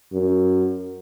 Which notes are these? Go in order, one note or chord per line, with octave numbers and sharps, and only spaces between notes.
F#2